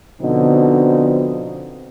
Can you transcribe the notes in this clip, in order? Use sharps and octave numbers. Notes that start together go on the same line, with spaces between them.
B2 D3 F3 C4 D#4